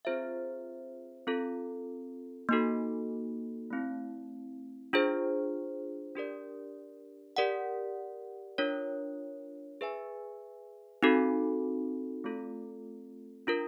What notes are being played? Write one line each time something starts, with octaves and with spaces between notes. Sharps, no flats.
C4 F4 G#4 C5 E5
C4 F4 A4
A#3 D#4 F#4 A4
A3 C4 E4
D4 F4 G#4 C5
D4 G4 A#4 D5
G4 A#4 D5 F#5
D4 F4 A#4 C#5
G#4 B4 E5 G#5
C4 D#4 F#4 A4
A3 C4 F4 A4
D4 F4 A#4